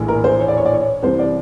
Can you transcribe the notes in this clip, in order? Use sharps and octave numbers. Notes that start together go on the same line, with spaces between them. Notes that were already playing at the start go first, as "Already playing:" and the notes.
Already playing: A#1 A2 E3
A#4
C5
C#5
D5
C#5
D5
C#5
C2 C3 E3 C5
D5